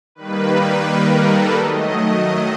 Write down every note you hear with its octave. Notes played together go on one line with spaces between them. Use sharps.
D#3 G3 A#3 B4
A#4
A4
D#3 F#3 A3 D#5